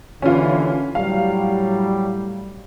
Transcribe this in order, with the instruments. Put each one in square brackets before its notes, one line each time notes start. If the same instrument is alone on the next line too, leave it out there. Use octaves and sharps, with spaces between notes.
[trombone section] D#2 D3 E3 [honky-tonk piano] C#4 F4
[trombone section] A2 F#3 G3 [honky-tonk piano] F5